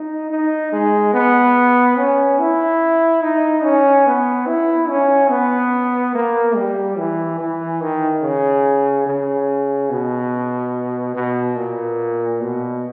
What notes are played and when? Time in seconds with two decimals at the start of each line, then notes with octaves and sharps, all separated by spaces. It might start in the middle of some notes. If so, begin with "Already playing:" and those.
Already playing: D#4
0.30 D#4
0.72 G#3
1.13 B3
1.97 C#4
2.39 E4
3.23 D#4
3.63 C#4
4.06 B3
4.47 E4
4.89 C#4
5.30 B3
6.15 A#3
6.56 G3
6.97 E3
7.39 E3
7.81 D#3
8.22 C#3
9.06 C#3
9.90 B2
11.15 B2
11.56 A#2
12.40 B2